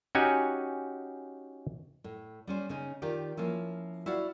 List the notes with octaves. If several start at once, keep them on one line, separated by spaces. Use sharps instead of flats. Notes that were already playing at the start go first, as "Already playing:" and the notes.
C#4 D#4 F#4 G4 F#5 G#5
A2
G3 C#4 C5
C#3 C#4 D#4
D#3 F4 G4 D5
F3 A#3 C#4 E4
E4 F#4 D5 F5